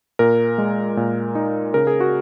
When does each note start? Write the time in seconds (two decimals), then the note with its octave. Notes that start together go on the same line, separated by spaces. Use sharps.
0.19 A#2 A#4
0.58 G#3
0.97 A#2
1.35 D#4
1.74 C#3 A#4
1.87 G#4
2.01 F#4